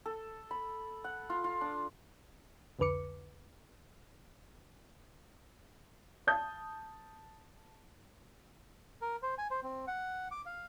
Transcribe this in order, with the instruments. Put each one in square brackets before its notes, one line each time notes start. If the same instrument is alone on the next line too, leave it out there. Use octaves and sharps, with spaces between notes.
[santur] A4
B5
F#5
F4
F4
D4
[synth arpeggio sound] C2 F2 D3 B4 D6 C#7
[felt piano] A5 D#6 G6
[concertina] A#4
C5
G#5
C5
C4
F#5
D6
F5